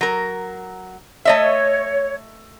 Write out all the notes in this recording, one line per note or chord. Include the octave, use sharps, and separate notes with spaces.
F#3 A#4
A3 C#5 D#5 E5